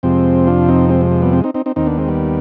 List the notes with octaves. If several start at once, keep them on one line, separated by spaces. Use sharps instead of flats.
F2 C3 F3 G#3 C4
D4 F4
C4 D#4
G#3 C4
G#3
G#3
G3 B3
G#3 C4
C4 D#4
C4 D#4
C4 D#4
D#2 D#3 C4 D#4
B3 D4
G#3 C4
G3 B3